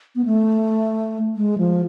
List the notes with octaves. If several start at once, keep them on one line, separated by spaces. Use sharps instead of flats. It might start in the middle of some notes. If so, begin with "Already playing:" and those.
B3
A3
G#3
F3